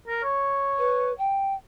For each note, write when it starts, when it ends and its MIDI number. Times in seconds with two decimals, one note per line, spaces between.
0.08 0.22 70
0.23 1.13 73
0.78 1.12 71
1.18 1.54 79